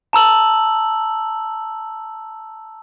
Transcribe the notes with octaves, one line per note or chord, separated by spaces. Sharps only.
A5 A#5 E6 F#7